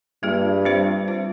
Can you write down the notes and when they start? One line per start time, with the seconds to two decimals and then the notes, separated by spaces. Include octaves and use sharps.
0.23 G2 G3 A#3 F4 G#4
0.65 G3 C4 F4 C5
1.08 G3 C4 F4 C5